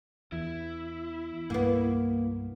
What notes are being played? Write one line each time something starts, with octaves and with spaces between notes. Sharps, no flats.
E2 E4
C2 G2 A#3 B3